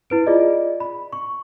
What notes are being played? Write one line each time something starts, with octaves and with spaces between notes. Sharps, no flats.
E4 B4 D7
F4 G#4 D5 D#5
B5
C#6